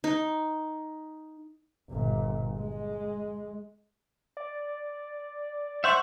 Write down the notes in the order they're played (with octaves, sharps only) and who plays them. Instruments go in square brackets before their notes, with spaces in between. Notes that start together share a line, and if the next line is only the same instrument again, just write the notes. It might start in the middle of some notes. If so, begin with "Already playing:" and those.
[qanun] D#4
[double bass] G1 A#2
G#3
[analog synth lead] D5
[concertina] C5 [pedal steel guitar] E5 F#5 C#6